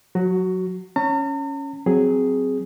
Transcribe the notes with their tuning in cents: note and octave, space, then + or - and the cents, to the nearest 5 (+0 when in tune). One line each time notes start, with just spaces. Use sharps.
F#3 -20 F#4 +15
C#4 +0 A#5 -45
F#3 +0 C4 -10 G#4 +0